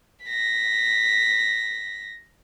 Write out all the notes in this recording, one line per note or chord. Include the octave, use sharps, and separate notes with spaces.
A#6 B6